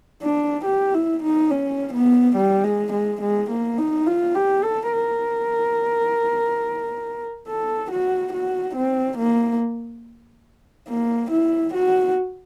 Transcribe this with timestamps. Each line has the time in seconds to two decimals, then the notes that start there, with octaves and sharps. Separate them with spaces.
0.23 D4
0.65 G4
0.94 E4
1.23 D#4
1.51 C#4
1.94 B3
2.37 G3
2.64 G#3
2.93 G#3
3.22 G#3
3.51 A#3
3.78 D#4
4.07 F4
4.35 G4
4.63 A4
4.93 A#4
7.48 A4
7.91 F#4
8.33 F#4
8.76 C4
9.18 A#3
10.89 A#3
11.31 E4
11.74 F#4